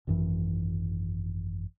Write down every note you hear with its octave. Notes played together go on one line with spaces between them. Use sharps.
G#1 F#2 E3